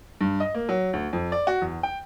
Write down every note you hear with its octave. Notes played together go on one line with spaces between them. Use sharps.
G2
D#5
A#3
F#3
D2
F2
D5
F#4
E2
G5